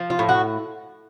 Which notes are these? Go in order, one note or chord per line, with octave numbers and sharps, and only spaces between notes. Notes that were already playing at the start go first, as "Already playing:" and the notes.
Already playing: F3
F4
A2
F#4